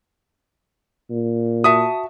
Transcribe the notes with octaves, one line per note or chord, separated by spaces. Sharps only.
A#2
F#4 E5 A5 D#6